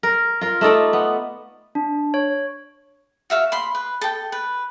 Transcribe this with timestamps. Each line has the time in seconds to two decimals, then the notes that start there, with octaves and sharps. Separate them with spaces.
0.03 A#4
0.41 F4 A#4
0.61 A3 D#4 A4 D5
0.93 B3
1.75 D4
2.14 C#5
3.30 F#4 E5 F5
3.52 B5 C6
3.75 B4
4.01 A4 G5
4.32 B4